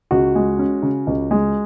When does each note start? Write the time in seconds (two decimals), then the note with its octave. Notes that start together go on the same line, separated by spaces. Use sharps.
0.11 C#2 F#4
0.35 G#3
0.59 C#4
0.83 C#3
1.07 C#2
1.31 G#3